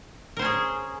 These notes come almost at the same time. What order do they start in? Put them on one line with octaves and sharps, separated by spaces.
A#4 C5 C#4 G#4